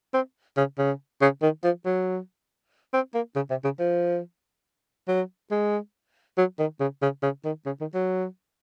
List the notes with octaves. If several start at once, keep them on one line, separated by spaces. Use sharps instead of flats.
C4
C#3
C#3
C#3
D#3
F3
F#3
C4
A#3
C#3
C3
C#3
F3
F#3
G#3
F#3
D#3
C#3
C#3
C#3
D#3
C#3
D#3
F#3